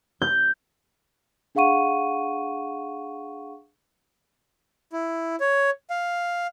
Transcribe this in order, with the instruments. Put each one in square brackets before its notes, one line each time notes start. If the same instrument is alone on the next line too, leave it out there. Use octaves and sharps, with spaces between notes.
[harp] G6
[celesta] D4 G#4 F5 F#5 C#6 D#7
[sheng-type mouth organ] E4
C#5
F5